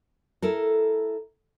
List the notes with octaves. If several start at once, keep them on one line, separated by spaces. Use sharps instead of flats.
E4 A4 A#4